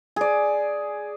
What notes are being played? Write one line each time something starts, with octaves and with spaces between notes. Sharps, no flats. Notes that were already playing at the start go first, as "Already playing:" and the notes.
G#4 D5